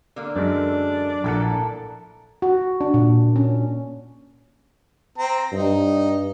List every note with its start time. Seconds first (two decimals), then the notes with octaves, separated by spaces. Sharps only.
0.16 D3 A#3
0.35 F#2 G#3 D4
1.24 A#1 E4 A4 A#4 F#5
2.42 F#4
2.81 D4
2.94 A#2
3.36 C#4
5.18 C4 A#5
5.52 G2 D#4